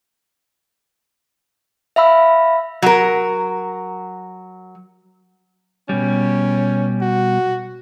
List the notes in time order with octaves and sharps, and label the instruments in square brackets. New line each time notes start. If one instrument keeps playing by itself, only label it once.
[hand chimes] E5 F5 B5 E6
[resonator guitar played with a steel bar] F#3 A#4
[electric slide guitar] B2 G3 [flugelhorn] C#4
[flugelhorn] F#4